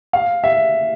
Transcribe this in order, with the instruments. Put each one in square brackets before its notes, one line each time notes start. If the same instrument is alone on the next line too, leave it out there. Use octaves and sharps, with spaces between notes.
[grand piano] F5
E5